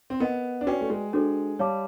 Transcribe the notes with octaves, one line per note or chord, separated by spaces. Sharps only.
C4
B3 A#4 D#5 F#5
D4
C#4 F#4 B4 D5 G5
A3
G#3
G#3 D4 F#4 A4 C5
G3 C#5 F5 A5 D6